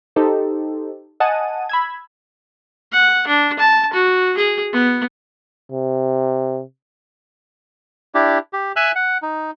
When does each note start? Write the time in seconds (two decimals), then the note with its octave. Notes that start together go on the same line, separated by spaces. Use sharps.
0.16 D#4 G4 A4 C5
1.20 D#5 F#5 G#5 A5 D#6 D#7
1.69 B5 E6 G#6
2.92 F#5
3.27 D4
3.59 A5
3.93 F#4
4.37 G#4
4.73 B3
5.72 C3
8.15 D4 E4 G4
8.53 G4
8.76 E5 G#5 E6 F#6
8.96 F#5
9.22 D#4